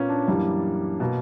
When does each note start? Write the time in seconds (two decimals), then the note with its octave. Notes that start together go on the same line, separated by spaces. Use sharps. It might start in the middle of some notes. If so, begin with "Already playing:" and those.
Already playing: A#2 A#3 B3 C#4
0.09 D4
0.28 F#2 E3 G3 A#3
1.00 B2 A#3